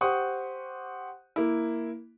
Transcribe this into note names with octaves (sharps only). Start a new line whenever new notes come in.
G4 C5 F#5 C#6 D#6
A#3 E4